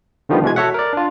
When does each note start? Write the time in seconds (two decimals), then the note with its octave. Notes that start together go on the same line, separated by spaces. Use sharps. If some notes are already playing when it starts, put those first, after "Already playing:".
0.29 D3 D#3 F3 G3 A3 B3
0.43 B2 E3 G#3 G#6
0.56 F#4 A4 C#5 E5 F#5
0.74 A#4 D5
0.93 D4 F4